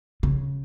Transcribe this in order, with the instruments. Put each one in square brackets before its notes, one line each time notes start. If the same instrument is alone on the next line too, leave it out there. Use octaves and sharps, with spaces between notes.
[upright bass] C#3